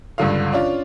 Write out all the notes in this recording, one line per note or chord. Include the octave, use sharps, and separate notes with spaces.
C#2 G2 D3 F5
C#4 D4 F4